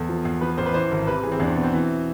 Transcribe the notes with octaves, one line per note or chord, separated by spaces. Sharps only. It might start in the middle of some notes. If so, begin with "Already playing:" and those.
Already playing: E2 A4
F3
E2
F3 B4
A1 C5
B4
E3 C5
G#1
C3 B4
E3 G#4
C4
E2 D4
C4
B2 B3
C4
E3